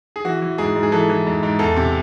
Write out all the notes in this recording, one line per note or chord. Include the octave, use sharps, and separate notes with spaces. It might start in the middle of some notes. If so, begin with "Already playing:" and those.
G#4
E3 F#4
E3
G#2 G#4
G#2
G#4
E3 A4
E3
G#2
G#2
E2 A4
C3